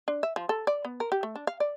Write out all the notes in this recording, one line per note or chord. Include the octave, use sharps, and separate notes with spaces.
D4
E5
F3
A4
D5
B3
A#4
G4
A3
D4
F5
D5